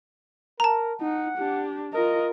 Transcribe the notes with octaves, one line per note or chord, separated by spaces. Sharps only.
A#4 A5 A#5
D#4 F#5
D4 G4
F4 A#4 D#5